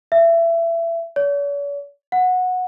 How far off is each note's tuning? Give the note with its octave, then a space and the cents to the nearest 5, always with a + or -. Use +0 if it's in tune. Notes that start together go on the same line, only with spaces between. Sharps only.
E5 +25
C#5 +45
F#5 -15